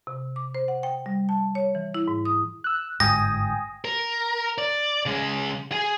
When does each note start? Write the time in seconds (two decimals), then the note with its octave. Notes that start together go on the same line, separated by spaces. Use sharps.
0.07 C3
0.36 D6
0.55 C5
0.68 F#5
0.83 G5
1.06 G3
1.29 A5
1.55 C#5
1.75 E3
1.94 E4
2.08 G#2
2.25 D#6
2.64 E6 F#6
3.00 G1 G#2 G5 G#5 D#6 A#6
3.85 A#4
4.58 D5
5.06 C#3 G#3
5.72 G#4 G#5